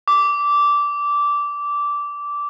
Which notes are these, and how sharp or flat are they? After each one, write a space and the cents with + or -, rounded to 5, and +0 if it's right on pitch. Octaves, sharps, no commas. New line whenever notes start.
D6 -15